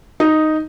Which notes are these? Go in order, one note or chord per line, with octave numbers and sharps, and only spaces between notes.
D#4